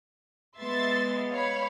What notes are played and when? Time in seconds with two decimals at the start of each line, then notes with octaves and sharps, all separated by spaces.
0.57 G#3 B3 E5 C6 A6
1.32 C#5 F5 B5